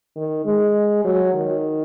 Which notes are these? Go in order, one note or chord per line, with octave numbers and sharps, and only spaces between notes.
D#3
G#3
F#3
D#3